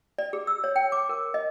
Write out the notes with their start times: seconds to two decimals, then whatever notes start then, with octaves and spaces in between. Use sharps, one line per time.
0.18 D5
0.33 G#4
0.47 E6
0.64 C#5
0.76 G5
0.92 D6
1.09 A#4
1.34 D#5